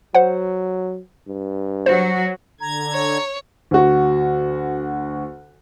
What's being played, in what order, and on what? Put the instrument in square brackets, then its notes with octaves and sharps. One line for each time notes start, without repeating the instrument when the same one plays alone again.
[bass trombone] F#3 [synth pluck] C5 F#5
[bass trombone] G2
[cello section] F#3 F#4 [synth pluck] C5
[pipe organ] D3 G#6 [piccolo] A#5
[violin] C#5
[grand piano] D2 F#4